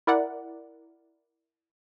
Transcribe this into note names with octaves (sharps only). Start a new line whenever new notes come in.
E4 A#4 D5 F#5